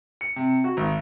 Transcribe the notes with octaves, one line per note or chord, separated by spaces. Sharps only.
C#7
C3
F#4
G#1